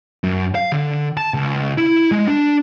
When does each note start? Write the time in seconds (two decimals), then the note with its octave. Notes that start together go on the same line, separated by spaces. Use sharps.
0.24 F#2
0.55 F5
0.72 D3
1.17 A5
1.34 C#2
1.78 E4
2.12 G#3
2.27 D4